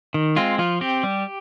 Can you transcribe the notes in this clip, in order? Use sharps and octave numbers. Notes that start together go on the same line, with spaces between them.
D#3
G#3 C4 F4
F3 F4
C4 G4
G3